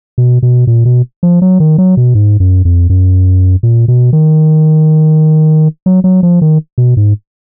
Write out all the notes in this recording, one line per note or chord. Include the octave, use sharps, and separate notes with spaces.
B2
B2
A#2
B2
F3
F#3
D#3
F#3
B2
G#2
F#2
F2
F#2
A#2
B2
D#3
F#3
F#3
F3
D#3
B2
G#2